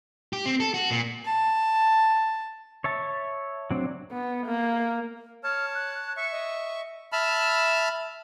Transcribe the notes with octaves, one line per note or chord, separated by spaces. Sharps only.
G4
C4
A4
F#4
A#2
A5
C#5 E5 A5
F#3 C4 D4
B3
A#3
C#5 A5 F6
F#6
E5 C#6 C#7
D#5
E5 A5 B5 F6